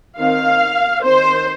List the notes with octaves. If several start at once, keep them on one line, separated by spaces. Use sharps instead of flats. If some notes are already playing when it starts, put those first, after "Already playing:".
D#3 C4 F5
D#3 C4 C5